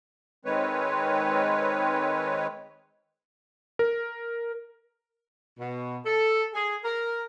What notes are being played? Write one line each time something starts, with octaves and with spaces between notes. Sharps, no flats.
D#3 G#3 C4 B4 C#5
A#4
B2
A4
G#4
A#4